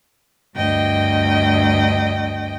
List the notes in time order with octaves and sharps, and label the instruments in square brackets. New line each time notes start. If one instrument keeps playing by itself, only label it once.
[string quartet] D2 G2 D#5 G5